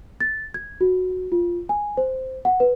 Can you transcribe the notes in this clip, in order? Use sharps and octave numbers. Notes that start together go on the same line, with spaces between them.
A6
G#6
F#4
F4
G#5
C5
F#5
B4